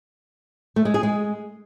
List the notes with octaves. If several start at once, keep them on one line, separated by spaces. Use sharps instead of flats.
A3
G#3
G#4
G#3